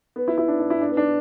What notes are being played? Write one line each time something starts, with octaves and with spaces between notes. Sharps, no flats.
B3
E4
E4
D4
D4
E4
D4
B3
D4